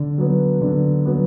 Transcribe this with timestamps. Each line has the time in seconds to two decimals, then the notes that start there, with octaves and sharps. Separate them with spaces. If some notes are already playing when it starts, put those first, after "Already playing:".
Already playing: D3
0.18 F#3 B3
0.61 D3
1.05 F#3 B3